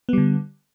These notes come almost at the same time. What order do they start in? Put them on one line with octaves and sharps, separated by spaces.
B3 G3 D3